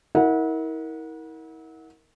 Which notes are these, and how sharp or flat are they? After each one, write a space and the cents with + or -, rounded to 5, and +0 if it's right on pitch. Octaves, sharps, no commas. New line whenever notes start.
E4 -40 A#4 +0 F#5 -20